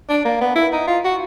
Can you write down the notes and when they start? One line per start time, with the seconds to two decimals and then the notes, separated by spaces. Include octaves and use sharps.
0.09 D4
0.25 A#3
0.41 B3
0.56 E4
0.73 D#4
0.88 F4
1.04 F#4